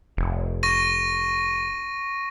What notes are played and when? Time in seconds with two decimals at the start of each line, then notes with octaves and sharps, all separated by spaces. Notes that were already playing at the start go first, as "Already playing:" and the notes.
0.17 F1
0.63 C#6 A#6 D#7